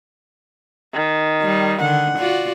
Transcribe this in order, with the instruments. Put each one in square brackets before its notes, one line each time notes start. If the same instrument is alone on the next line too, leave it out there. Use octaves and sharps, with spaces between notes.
[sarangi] D#3
[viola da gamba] G3
[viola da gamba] D3 D#3 [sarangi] F#5
[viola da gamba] F4 F#4 D5